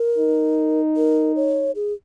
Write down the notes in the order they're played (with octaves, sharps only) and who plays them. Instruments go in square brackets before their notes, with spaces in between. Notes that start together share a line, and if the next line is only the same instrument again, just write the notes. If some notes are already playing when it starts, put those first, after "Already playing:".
Already playing: [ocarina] A#4
[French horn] D#4
[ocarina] A#4
C#5
G#4